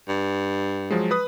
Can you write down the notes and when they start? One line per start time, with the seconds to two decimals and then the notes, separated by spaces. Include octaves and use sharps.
0.08 G2
0.90 F3 F#3 G#3
1.11 B4 D#6